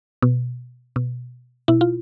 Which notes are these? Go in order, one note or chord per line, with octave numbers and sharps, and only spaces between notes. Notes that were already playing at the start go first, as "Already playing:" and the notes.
B2
B2
B2 E4
F4